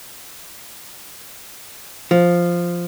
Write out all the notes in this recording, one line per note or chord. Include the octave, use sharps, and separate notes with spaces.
F3